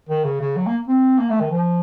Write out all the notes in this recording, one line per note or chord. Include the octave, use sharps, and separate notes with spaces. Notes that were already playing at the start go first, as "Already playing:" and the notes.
D#3
C#3
C#3
F#3
A#3
C4
A#3
A3
D#3
F3